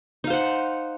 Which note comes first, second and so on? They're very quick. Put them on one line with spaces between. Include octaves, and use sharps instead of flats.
D#4 F5 C5 F#5